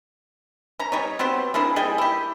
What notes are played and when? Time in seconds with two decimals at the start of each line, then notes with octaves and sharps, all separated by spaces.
0.79 C#4 A#5
0.92 G3 D#4 C#5
1.19 B3 C4 F#4 G4
1.54 A#3 D4 E4 G#4
1.76 G3 G#4 D#5 G5
1.98 E4 G4